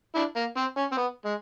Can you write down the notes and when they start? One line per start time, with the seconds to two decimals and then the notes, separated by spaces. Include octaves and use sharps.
0.15 D4 E4
0.36 A#3
0.57 C4
0.77 C#4
0.92 C4
0.97 B3
1.25 G#3